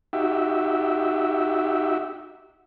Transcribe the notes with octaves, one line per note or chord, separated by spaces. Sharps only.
D#4 F#4 G4 E5